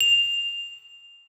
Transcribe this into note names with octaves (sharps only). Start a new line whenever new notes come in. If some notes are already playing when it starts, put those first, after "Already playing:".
F7